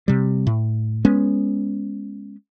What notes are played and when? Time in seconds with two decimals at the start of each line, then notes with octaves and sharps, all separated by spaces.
0.08 C3 G3
0.47 A2
1.05 G#3 B3 C#4